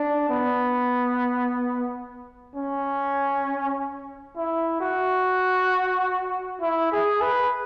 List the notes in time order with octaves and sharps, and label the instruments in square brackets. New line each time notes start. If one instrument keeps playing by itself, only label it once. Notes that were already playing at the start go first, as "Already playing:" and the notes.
Already playing: [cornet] D4
B3
C#4
E4
F#4
E4
G#4
B4